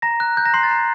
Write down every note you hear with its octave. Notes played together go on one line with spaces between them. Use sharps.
A#5 A#6
F#6
F#6 G6
A#5 A#6
C6 F#6 C7
A6
A#5